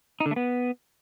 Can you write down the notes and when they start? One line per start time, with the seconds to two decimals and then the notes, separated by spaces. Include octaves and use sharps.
0.20 D#4
0.26 D3
0.31 A3
0.36 B3